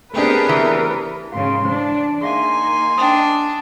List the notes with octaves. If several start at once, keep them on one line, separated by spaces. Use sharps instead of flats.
A3 B3 C4 D4 G4 G#4 A#4 B4
E3
G#2 C#3 F#4 F5 C6
E3 D4 E4 C5
A#3 D#4 G#4 E5 F5 G#5 C6
D4 G5 D#6